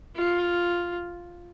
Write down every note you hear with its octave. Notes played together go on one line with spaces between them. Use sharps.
F4